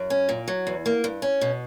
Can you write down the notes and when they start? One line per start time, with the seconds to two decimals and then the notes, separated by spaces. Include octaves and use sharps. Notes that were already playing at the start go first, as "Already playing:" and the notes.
Already playing: F#2
0.10 C#4
0.29 A#2
0.48 F#3
0.67 E2
0.86 A#3
1.04 G2
1.22 C#4
1.41 B2